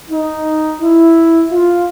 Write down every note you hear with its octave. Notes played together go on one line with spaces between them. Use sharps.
D#4
E4
F4